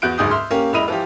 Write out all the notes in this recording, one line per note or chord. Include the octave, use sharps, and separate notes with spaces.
E2 F#4 F#6 G6 D7
F#1 D2 G#2 G#4 D#6 G6
E5 C6 F6
A#3 C#4 G4 A#4
E1 E4 D#5 B5 D#7 F7
E3 F3 G4